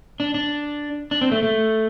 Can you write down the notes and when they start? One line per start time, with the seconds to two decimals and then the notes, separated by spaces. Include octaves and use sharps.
0.20 D4
0.34 D4
1.11 D4
1.21 C4
1.31 A3
1.43 A3